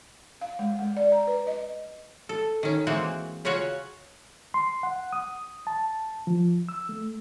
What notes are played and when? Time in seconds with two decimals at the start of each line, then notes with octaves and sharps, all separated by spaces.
0.41 F5
0.59 G#3
0.79 G#3
0.97 D5
1.12 A#5
1.27 B4
1.47 D#5
2.29 A4
2.63 D#3 C#4
2.87 E3 G#3 A#3 C4 F#4
3.45 C#3 C#4 F4 F#4 C#5
4.54 C6
4.83 F#5
5.13 D#6
5.67 A5
6.27 F3
6.69 E6
6.89 A3